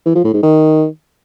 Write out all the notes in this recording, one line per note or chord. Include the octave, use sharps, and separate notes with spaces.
E3
F3
A2
G#2
D#3